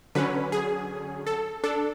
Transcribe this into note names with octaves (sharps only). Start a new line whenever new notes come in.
D3 F#3 C#4 B4
G#4
A4
D4 A4